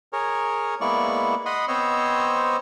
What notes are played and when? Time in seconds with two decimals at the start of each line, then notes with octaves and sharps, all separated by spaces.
0.13 G#4 A#4 C#5
0.81 G#3 A#3 B3 E4 D5 C#6
1.46 D#5 F#5 B5 C6 D#6
1.68 B3 C4 C5 C#5 D#5 E6